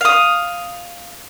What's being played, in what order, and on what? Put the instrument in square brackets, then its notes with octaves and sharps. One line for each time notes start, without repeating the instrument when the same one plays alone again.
[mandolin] F5 D#6